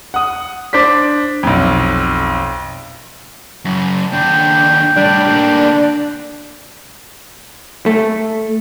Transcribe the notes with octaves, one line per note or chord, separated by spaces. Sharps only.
F#5 D#6
D4 C5 D5 B6
B1 F2
F#2 C#3
D#2 D4 G5
A2 G3 D4
D3 A#3
A3